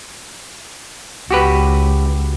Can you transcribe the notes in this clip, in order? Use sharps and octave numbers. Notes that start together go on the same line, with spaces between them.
C#2 F#4 G4 B4